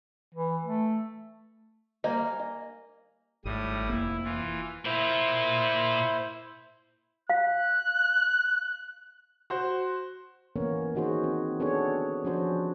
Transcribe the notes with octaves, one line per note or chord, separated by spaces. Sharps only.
E3
A3
G3 A#3 C5 D#5 G#5
D#5
G#1 A2 G3 D#6
F1 A#3 E4
E3 F4
A#2 E4 F4 C5
F5 F#6
F#4 C5
E3 A#3 B3 C#4 A#4 C#5
D#3 D#4 F#4 G#4 C5
C4
B3 D4 F#4 G#4 A4 C#5
F3 C#4 D4 F#4 C5